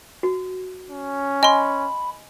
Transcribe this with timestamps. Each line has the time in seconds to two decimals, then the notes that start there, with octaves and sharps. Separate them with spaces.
0.23 F#4
0.90 C#4
1.43 D#5 G#5 B5 C6